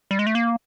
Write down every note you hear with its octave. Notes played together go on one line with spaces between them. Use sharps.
G3
G#3
A3
A#3